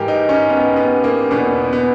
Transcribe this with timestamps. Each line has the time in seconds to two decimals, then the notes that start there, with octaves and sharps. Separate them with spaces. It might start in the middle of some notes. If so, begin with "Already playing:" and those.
Already playing: G#2 E3 G4 A#4
0.08 D#4
0.29 C#4
0.49 B3
0.76 B3
1.04 A#3
1.31 E2 B2 B3
1.73 B3